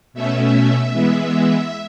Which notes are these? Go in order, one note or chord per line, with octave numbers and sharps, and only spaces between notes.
B2 A3 C#4 E5
E3 G#3 B3